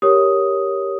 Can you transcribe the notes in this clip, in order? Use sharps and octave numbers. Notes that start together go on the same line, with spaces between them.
G4 A#4 C#5 D#6